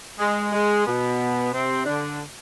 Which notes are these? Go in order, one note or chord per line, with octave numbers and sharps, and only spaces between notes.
G#3
G#3
B2 B3
C3 C4
D3 D4